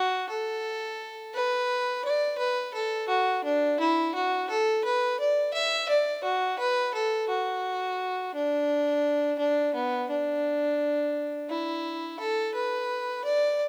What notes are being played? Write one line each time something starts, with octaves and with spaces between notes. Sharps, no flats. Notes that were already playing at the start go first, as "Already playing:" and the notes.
Already playing: F#4
A4
B4
D5
B4
A4
F#4
D4
E4
F#4
A4
B4
D5
E5
D5
F#4
B4
A4
F#4
D4
D4
B3
D4
E4
A4
B4
D5